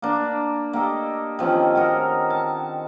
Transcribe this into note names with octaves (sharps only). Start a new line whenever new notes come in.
A#3 D4
A#3 G4 A4 D#5
D#3 F3 C4 C#4
F#4 A4 A#4 D#5
A5